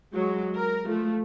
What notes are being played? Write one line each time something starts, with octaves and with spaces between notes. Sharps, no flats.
F#3 G#3
A#4
F3 A3